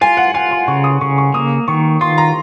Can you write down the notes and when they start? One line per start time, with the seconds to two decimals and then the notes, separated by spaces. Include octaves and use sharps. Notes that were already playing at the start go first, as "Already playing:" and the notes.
0.01 F4 G#5
0.17 F#5
0.34 F4 G#5
0.51 C6
0.68 C#3 C#6
0.84 D#6
1.01 C#3 C#6
1.18 C#6
1.34 A#3 D#6
1.68 D#3 C#6
2.01 F4 C6
2.18 A#5